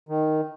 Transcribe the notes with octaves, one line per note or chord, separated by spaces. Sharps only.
D#3